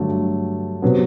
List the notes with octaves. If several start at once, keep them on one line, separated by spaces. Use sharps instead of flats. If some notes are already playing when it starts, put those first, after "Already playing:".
Already playing: G2 D3 F#3 A3
C3 F#3 B3